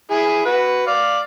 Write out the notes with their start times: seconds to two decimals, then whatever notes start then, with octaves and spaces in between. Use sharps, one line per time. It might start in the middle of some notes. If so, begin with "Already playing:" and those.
0.11 E4 G#4 G#5
0.45 F#4 B4
0.87 D5 F5